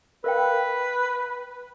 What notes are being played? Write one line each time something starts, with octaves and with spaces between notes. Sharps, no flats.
A#4 B4 F5 G5